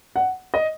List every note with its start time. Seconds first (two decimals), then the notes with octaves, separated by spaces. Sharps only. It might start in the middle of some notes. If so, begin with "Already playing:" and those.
0.16 F#5
0.54 D#5